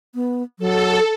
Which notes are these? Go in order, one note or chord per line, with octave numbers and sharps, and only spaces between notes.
B3
F#3 A4